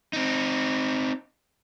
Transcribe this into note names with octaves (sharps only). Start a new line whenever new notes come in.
C4 D#4